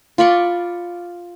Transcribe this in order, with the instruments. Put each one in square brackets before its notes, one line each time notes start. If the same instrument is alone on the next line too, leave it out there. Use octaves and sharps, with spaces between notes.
[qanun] F4 D5 B5 C#6